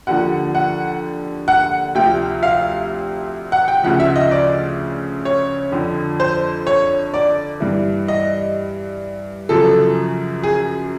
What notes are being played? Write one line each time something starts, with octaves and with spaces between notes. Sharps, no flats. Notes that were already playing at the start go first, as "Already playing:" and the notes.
D#2 D3 F3 F#5
F#5
F#5
D2 C3 F3 G5
F5
F#5
G5
D2 C#3 F3 F#5
E5
D#5
D5
C#5
F2 D3 F3
C5
C#5
D5
G2 E3
D#5
F#2 C#3 F3 A4
G#4